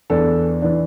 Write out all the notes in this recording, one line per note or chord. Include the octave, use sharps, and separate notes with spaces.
E2 E3 D4 A4
E3 D4